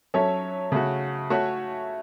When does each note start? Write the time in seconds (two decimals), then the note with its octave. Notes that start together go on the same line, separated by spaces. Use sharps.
0.14 F#3 C#4 A4 C#5 E5
0.72 C#3 A3 F#4
1.30 A3 F#4 A4 C#5 E5